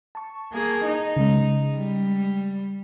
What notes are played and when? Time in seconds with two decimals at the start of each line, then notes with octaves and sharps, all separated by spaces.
0.15 A5 C#6
0.53 A#3 G#4
0.85 D#4
1.16 C#3 G#3
1.76 G3